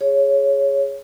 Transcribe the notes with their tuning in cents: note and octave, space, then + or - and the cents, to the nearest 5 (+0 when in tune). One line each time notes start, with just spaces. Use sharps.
G#4 +0 C#5 +0